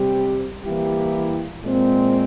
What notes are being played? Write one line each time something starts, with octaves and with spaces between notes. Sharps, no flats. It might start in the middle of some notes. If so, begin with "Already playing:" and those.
Already playing: C3 G3 C4 G4
E3 G3 A#3 E4 G4
A#2 G#3 C4